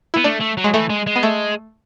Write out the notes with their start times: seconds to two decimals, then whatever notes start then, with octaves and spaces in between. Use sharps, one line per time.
0.14 B3 E4
0.24 A3 D4
0.40 A3
0.57 F#3
0.64 G#3
0.74 E3 A3
0.90 G#3
1.07 G#3
1.16 B3
1.23 A3